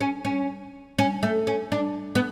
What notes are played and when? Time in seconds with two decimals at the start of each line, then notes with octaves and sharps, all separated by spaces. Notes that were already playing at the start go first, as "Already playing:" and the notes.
0.01 C#4
0.25 C#4
0.99 C#4
1.23 A3
1.47 C#4
1.72 D4
2.15 B3